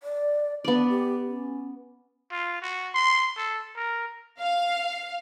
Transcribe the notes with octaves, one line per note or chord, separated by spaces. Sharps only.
D5
B3 D4 D5
G4
C#4
F4
F#4
C6
A4
A#4
F5